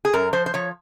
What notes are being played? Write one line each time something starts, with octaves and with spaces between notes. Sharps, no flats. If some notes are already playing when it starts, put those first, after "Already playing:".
G#4
F#2 A#4
F3 C5
C5
F3 C#5